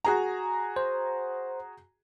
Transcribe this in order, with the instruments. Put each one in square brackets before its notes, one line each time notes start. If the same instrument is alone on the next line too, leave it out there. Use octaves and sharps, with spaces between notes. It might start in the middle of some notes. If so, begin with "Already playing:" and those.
[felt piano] F#4 G#4 A#5
[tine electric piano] C5